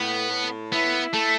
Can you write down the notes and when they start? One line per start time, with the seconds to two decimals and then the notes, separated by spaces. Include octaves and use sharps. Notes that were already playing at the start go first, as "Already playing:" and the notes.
Already playing: A2 B3
0.30 A2
0.72 B3 E4
1.14 A3 A4